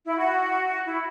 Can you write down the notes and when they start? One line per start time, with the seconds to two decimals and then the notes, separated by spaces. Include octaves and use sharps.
0.06 E4
0.17 F#4
0.86 E4